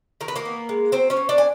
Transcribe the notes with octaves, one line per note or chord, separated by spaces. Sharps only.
D#3 A#4
B4
A#3 A#4
B3
G#3
F#3 C4 C5
C#4 C#5
C4
D4 D5
G#5